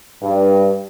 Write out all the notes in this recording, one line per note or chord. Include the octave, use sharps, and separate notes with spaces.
G2